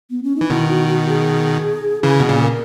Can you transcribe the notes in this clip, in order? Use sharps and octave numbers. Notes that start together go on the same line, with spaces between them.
B3
C#4
D#4
E3
B2 D#3 E4
F#4
F#4
G#4
C#3 E3 G#4
B2
A#2 C#3
A#4